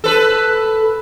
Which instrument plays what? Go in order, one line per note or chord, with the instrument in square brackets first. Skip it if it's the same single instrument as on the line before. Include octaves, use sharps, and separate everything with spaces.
[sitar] A4 B4